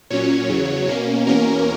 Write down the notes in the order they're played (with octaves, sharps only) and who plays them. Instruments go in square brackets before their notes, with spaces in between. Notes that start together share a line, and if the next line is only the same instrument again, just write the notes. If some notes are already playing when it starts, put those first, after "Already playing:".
[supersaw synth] A#2 F#3 C#4 C#5
E2 C#3 F#3
B2 A#3 C#4
E2 B2 A#3 C#4 A#4